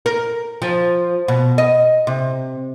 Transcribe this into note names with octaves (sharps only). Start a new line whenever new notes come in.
A#4
F3
B2
D#5
C3